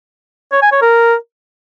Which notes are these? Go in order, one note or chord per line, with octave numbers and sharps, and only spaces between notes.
C#5
G#5
C#5
A#4